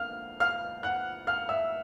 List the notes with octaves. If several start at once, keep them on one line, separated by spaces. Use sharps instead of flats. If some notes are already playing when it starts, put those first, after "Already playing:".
Already playing: D2 D3 A#3 F5 F6
F5 F6
F#5 F#6
F5 F6
E5 E6